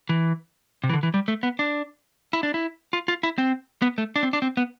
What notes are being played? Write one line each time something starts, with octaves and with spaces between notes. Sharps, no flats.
E3
C3
E3
D3
E3
G3
A3
B3
D4
E4
D4
E4
F4
F4
E4
C4
B3
A3
D4
C4
D4
C4
B3